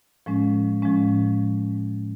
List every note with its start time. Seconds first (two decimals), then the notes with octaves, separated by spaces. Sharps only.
0.26 A2 F3 G#3 C#4
0.82 A2 F3 G#3 C#4